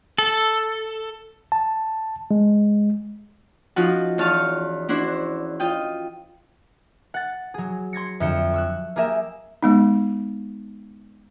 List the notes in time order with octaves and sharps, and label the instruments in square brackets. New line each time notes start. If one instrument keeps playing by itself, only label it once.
[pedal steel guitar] A4
[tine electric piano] A5
G#3
[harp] F3 C#4 D#4 F4 F#4
E2 D#4 C#5 F5 A5 F6
C#4 D4 E4 F#4 C5
F4 D#5 G5
F#5 A6
F#3 G#4
C6 G#6 A#6 C#7
F2 D3 E5 G6 C#7
C#6 E6 F#6
A#3 G4 G#4 A#4 E5
[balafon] G#3 B3 D#4